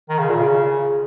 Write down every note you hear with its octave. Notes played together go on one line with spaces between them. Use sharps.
D#3
C#3
A#2
C#3